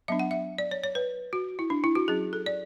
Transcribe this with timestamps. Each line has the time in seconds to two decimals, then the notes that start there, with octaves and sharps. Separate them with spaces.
0.08 F#3 B3 D4 E5
0.19 F#5
0.31 E5
0.58 D5
0.71 C#5
0.84 C#5
0.95 B4
1.33 F#4
1.59 E4
1.70 D4
1.84 E4
1.95 F#4
2.08 F#3 C#4 G#4
2.33 A4
2.46 D5